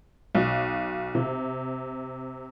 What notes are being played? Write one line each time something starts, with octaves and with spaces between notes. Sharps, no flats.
B1 F#4
C3